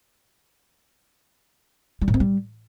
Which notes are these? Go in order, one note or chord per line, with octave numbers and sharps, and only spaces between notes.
G3
A2
C4
G3